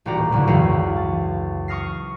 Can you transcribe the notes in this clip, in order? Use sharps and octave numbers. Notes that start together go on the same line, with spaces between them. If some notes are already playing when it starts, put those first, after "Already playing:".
D#1 A1 F#4 G4 D5 A#5
F#1 D2 G#2 D3
C#2 F#2 E3 F#4 G#4 F5
A6
C#6 D#6 F6 A#6 C7